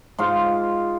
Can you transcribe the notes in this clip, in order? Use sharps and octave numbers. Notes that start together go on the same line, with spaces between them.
G#2 F4 C6